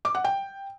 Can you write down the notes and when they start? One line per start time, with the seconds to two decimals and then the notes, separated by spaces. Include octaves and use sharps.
0.05 D6
0.15 F#5
0.25 G5